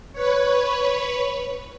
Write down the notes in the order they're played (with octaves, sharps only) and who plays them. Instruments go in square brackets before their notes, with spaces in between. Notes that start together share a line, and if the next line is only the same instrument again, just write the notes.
[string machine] B4 C#5